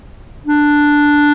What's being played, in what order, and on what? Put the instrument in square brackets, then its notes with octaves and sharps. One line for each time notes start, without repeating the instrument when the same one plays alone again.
[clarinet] D4